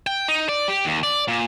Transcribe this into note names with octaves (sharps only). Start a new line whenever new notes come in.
G5
D#4
D5
G4
D#2
D5
A#2